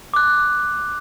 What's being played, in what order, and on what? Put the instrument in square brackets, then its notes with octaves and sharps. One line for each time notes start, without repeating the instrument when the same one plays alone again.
[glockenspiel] D6 F#6